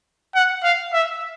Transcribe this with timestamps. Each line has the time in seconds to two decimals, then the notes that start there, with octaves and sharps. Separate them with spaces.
0.35 F#5
0.64 F5
0.93 E5